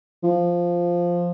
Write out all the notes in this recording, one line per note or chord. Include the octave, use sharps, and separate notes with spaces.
F3